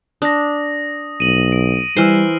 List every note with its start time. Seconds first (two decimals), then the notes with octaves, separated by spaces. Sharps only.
0.22 D4 D#6 A#6
1.20 B1 D#7 F#7
1.52 D7
1.97 E3 G3 C5 E6 F6 C7